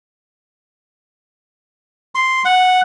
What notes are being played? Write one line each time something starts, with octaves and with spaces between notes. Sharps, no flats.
C6
F#5